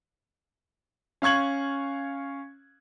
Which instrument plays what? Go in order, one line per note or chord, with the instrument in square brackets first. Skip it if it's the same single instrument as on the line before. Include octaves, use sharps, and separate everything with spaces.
[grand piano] C#4 F5 C#6 G#6 F#7